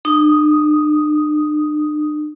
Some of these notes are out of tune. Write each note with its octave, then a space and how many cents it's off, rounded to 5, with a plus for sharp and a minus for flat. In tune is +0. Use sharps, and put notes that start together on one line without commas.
D4 +45 D#6 +0